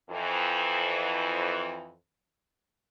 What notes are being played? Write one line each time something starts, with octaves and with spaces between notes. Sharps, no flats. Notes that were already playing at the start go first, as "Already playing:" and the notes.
F2 E3